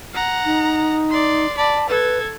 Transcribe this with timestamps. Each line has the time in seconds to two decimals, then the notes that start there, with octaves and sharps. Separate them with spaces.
0.14 F#5 A#5
0.45 D#4
1.10 D5 C6
1.57 D5 A5 B5
1.89 A4 B4 G#6